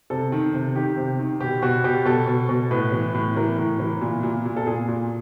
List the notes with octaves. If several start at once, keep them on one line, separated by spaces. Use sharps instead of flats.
C3 A4
D#3
C3
D#3 G4
C3
D#3
B2 G4
B2 F#4
B2 G4
B2 A4
B2
B2
A2 B4
E3
A2
E3 A#4
A2
E3
A#2
A#2
A#2
A4
A#2 G#4
A#2